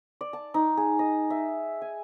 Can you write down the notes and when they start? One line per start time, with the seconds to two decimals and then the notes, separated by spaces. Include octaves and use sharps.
0.21 D5
0.33 A5
0.54 D#4
0.77 G#4
0.99 D#5
1.30 E5
1.81 G#5